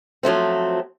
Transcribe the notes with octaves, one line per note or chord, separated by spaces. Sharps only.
F3 F#3 A3 C4